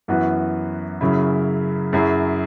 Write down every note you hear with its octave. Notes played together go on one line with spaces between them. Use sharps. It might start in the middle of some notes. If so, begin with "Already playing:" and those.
F#2 E3 B3 F#4 B4
F#2 C#3 F#3 E4
F#2 F#3 E4 G#4